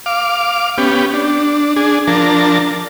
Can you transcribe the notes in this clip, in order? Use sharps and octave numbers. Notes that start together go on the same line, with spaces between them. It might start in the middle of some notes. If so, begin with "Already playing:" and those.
F5 D6
B3 C#4 G4
D4
D4 G#4
F3 D4 A#4 A5